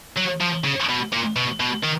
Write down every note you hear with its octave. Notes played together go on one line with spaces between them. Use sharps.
F#3
F3
C#3
B2
A#2
B2
B2
D#3